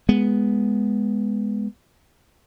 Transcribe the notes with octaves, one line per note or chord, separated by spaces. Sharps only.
G#3 B3